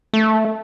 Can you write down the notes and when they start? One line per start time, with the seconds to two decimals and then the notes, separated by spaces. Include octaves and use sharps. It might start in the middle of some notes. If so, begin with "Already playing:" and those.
0.13 A3